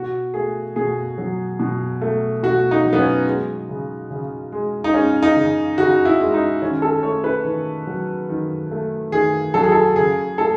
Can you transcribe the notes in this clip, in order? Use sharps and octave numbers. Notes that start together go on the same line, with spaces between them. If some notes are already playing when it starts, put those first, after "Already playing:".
Already playing: B2 F#4
A3 G#4
B2 G#4
F#3
B2
A3
B2 F#4
D#4
F#3
B3
C#4
G#3
C#3
C#3
G#3
D#4
G#3 C#4
D#4
C#3
C#3 F#4
E4
G#3
D#4
D#3 C#4
A4
A3 C#5
B4
D#3
F#3
D#3
A3
D#3 G#4
F#3 A4
G#4
A4
C#3 G#4
A3 A4